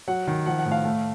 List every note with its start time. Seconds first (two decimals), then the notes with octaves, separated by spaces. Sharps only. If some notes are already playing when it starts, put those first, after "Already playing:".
0.08 F#3 F#5
0.27 D#3
0.46 F3 F#5
0.59 F#5
0.65 A2
0.72 F5
0.85 A3